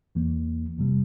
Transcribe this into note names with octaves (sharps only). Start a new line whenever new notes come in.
E2 E3 A#3
G1 F2 C3 G3